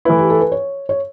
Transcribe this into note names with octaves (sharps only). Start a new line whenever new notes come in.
E3 A3 E4 B4
G4
A4
B4
C#5
C#5